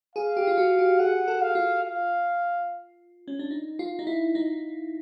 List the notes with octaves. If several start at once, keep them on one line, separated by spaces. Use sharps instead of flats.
G#4 F5
G4
F4
F#4
G4
G#4 F#5
A4
F5
F4
F5
C#4
D4
D#4
F4
D#4
E4
D#4